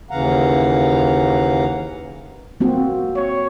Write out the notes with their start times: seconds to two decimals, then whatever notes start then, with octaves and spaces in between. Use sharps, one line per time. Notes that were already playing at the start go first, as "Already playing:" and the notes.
0.11 D#2 C#3 E3 F5 F#5 A#5
2.60 A#3 C4 F#4
3.16 C#5